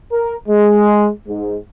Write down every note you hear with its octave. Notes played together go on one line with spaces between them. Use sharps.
A#4
G#3
G#2